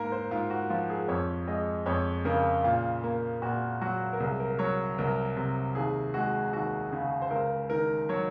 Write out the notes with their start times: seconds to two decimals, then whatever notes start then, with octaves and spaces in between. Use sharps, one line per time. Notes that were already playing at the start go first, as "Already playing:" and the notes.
Already playing: G#2 A#3 A#4
0.12 C5
0.31 G#2 F4
0.50 F#4
0.70 F3 F4
0.90 G#4
1.08 F2 C#5
1.47 G#3 D#5
1.86 F2 C#5
2.25 C#3 A#4
2.64 A#2 F4
3.04 A#3
3.42 A#2 F#4
3.81 F#3 F#4
4.13 A#4
4.20 C2 G#4
4.40 A#4
4.59 F#3 C#5
4.98 C2 A#4
5.36 C3
5.75 D#2 G#4
6.14 G#3 F#4
6.53 D#2 F#4
6.92 C#3
7.22 C5
7.31 C#2 A#4
7.70 D#3 A#4
8.09 F#3 C#5